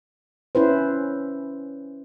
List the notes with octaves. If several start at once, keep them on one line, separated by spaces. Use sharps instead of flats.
C#4 E4 B4 C5